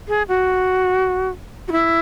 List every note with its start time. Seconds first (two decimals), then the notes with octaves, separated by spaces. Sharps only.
0.08 G#4
0.29 F#4
1.68 F#4
1.72 E4